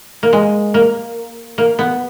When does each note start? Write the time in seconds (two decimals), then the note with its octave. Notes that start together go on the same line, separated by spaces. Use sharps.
0.23 A#3
0.33 G#3
0.74 A#3
1.58 A#3
1.79 B3